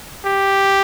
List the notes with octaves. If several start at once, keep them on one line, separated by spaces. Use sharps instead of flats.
G4